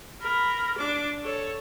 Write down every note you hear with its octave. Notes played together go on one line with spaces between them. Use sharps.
A#4 B5
D4 D6
A4 C#5